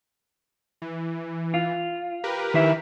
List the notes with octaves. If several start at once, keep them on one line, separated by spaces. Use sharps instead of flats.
E3
F4
G4 A#4 B4
D#3 E4 E5